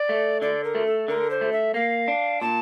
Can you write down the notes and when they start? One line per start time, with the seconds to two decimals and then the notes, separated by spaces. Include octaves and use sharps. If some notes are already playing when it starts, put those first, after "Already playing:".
Already playing: D5
0.09 A3
0.42 D3 D5
0.64 A#4
0.75 A3
0.87 A4
1.08 D3 A#4
1.31 C5
1.41 A3
1.53 E5
1.74 A#3 F5
2.08 D4
2.41 A#2 A5